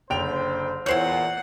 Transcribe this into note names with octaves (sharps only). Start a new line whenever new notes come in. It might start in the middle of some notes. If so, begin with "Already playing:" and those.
F#1 D3 C5 G5 F7
E2 A#2 E4 C5 C#5 F#5 G6 C7